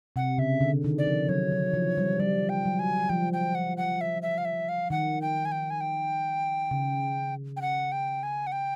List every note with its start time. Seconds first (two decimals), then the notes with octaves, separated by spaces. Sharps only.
0.16 C3 F#5
0.38 C#3 E5
0.61 D3
0.84 D#3
0.98 D5
1.07 F3
1.29 F#3 C#5
1.51 F#3
1.74 F3
1.98 G3
2.20 G3 D5
2.49 G5
2.65 F#3
2.79 G#5
3.09 F3 G5
3.33 G5
3.55 F#5
3.77 F#5
4.01 E5
4.22 E5
4.38 F5
4.45 E5
4.69 F5
4.90 D#3 F#5
5.22 G5
5.45 G#5
5.52 G5
5.70 G#5
5.81 G5
6.71 C#3
7.57 G5
7.62 F#5
7.92 G5
8.23 G#5
8.47 F#5
8.52 G5